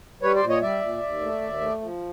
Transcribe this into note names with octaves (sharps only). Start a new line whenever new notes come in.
G3 B4 C#5
C5 D5
A#2
C#5 D#5
G3 D5 E5
A#2
D#2
A3
D#2
A3
F3